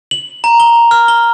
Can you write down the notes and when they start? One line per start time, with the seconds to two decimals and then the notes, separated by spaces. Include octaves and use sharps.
0.11 F#7
0.44 A#5
0.60 G7
0.91 F6
1.08 G7